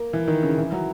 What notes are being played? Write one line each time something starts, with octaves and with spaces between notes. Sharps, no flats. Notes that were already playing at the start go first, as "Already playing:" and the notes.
Already playing: A#3
E3
D#3
C#3
E3
F#3